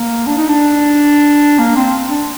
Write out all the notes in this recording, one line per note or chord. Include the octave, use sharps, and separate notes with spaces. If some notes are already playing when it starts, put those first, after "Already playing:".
Already playing: A#3
D4
D#4
D4
A#3
C4
D4